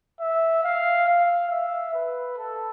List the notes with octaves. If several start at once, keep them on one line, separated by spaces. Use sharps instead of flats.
E5
F5
F5
E5
B4
A4